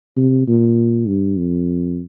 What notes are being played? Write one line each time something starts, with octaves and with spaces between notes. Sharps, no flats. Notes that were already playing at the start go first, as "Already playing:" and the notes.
C3
A#2
G2
F2